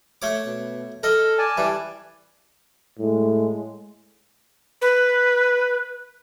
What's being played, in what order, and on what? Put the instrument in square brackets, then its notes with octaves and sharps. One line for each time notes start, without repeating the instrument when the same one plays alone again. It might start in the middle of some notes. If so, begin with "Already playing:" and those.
[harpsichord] A3 C#5 D6
[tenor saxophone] B2
[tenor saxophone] A4 [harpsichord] A#4 D#5
[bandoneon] D5 G#5 A5
[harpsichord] E3 [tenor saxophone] G3
[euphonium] A2 [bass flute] G#3
[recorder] B4